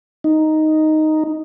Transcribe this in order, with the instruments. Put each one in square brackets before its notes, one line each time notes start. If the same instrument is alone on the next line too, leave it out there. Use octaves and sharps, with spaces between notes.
[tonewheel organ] D#4